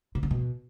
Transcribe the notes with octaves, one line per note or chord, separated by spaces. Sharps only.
C3
C#3
B2